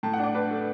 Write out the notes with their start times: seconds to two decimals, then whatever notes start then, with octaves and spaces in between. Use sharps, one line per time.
0.03 A2 A5
0.13 F#5
0.19 D4 D5
0.34 D4 B4
0.51 A3